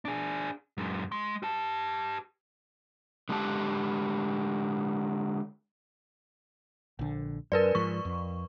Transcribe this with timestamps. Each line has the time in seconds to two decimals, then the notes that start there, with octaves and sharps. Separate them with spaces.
0.05 D4 G#4
0.78 F#2 G#3
1.12 G#3 C6
1.43 G4 A5
3.29 D3 G#3 G4 A5
6.99 A#1 D3
7.52 F#2 A#4 B4 D5
7.75 G#2 F3 C#6
8.05 F2